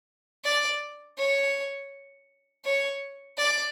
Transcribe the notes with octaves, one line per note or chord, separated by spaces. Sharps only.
D5
C#5
C#5
D5